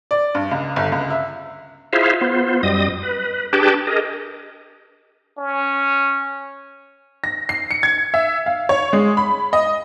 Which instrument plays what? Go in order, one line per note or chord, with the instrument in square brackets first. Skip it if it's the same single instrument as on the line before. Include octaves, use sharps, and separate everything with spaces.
[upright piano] D5
G2
C#2
G1
C#2
E5
[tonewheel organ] E4 F4 G#4 C5 E5 F5
B3 F4 C5
F#2 G3 D#5 D#6
B4
D4 G4 G#4 B4 G5 A5
G#4 A#4 D#5
[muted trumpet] C#4
[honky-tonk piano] A#6
C7
C#7
G#6
E5
F5
C#5
G#3
B5
D#5